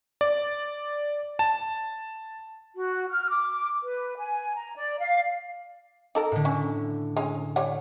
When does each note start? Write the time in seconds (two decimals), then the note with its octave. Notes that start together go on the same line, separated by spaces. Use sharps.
0.21 D5
1.39 A5
2.74 F#4
3.09 F6
3.28 D6
3.82 B4
4.17 G#5
4.55 A#5
4.77 D5
4.99 F5
6.15 D#4 A4 A#4
6.32 A2 D3
6.45 C#4
7.17 G#3 C#4
7.56 G3 C#5 F#5